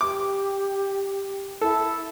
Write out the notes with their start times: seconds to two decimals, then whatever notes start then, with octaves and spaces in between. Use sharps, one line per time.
0.01 G4 D6
1.61 E4 A4